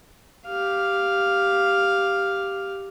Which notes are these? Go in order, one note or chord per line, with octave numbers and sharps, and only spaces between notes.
G4 F5